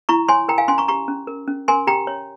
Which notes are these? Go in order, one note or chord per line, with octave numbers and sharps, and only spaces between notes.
E4 A#5 C#6
C#5 G#5 C6
A#4 G5 A#5
F5 G#5
C#4 G#5 C6
A#5 C#6
G4 A#5 C#6
C#4
A#4
C#4
A#4 G#5 C6
G4 G5 A#5
C#5